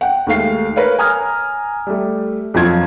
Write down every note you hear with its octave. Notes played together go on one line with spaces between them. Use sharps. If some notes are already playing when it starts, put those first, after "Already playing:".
F#5 G5
D#2 G#3 A3 F5 C7
A#4 B4 C#5 F5
G#5 A#5 D#6 F6 G#6
G3 A3
F2 F3 F#3 F4 G#6